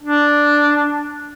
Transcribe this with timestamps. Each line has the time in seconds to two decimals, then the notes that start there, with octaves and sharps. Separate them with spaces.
0.03 D4